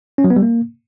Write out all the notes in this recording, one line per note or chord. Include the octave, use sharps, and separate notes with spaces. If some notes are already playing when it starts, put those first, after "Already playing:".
C#4
F#3
B3
G3
A#3